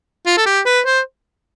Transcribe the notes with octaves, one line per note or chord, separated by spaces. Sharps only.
F4
A4
G4
B4
C5